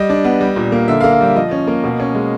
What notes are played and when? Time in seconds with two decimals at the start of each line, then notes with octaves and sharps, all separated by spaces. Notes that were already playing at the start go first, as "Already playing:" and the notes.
Already playing: G3 D#5
0.10 D4
0.24 B3
0.41 G3
0.56 A#2
0.72 A#3
0.88 D3 E5
1.01 F5
1.04 A#3
1.12 F5
1.21 G3 E5
1.36 F3 D#5
1.51 C#4
1.67 A#3
1.84 B2
2.00 C#4
2.15 G#3